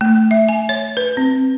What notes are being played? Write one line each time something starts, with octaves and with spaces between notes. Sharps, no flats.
A3
E5
G#5
C#5
B4
C4